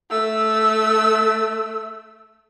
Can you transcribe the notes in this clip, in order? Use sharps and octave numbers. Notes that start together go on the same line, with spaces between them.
A3 E6